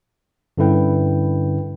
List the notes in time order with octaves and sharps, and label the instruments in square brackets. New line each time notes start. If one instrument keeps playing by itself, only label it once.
[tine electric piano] G2 D3 C#4 E4 B4 G5